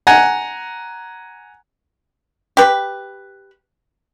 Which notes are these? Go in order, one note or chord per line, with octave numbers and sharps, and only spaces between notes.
F#5 G#5 A#5
G4 B4